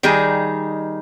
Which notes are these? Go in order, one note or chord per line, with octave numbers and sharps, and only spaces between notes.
D#3 G3 D#4 G#4